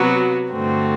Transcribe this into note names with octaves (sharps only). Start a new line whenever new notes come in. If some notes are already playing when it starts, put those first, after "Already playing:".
Already playing: C3 F#3 B3 F#4
G2 D3 A3 C4 F#4